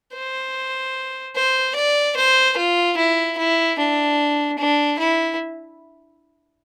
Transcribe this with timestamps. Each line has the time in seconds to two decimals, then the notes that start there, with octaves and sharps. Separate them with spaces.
0.14 C5
1.35 C5
1.75 D5
2.16 C5
2.57 F4
2.97 E4
3.38 E4
3.78 D4
4.58 D4
4.99 E4